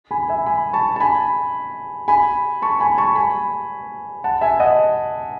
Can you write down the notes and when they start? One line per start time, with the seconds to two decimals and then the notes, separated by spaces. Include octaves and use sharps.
0.11 G#5 B5
0.29 E5 G#5
0.46 G#5 B5
0.73 A5 C#6
0.96 A5
1.00 G#5 B5
2.08 G#5 B5
2.62 A5 C#6
2.80 G#5 B5
2.98 A5 C#6
3.16 G#5 B5
4.24 F#5 A5
4.41 E5 G#5
4.60 D#5 F#5